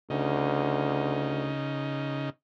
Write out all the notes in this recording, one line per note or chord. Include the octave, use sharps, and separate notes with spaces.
D2 C#3 D#4